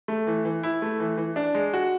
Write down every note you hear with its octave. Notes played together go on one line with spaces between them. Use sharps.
A3
E3
E3
E4
A3
E3
E3
D4
G#3
F#4